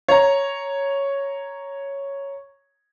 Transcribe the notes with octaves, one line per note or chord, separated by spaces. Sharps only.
C#5 A#5